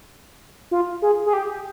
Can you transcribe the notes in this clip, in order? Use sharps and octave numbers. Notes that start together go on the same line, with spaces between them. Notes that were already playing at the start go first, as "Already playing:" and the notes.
F4
G#4
G#4
G4